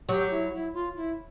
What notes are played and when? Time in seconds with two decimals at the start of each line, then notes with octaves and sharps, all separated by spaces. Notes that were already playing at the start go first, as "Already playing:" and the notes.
0.09 F#3 G4
0.31 E4
0.53 E4
0.74 F4
0.96 E4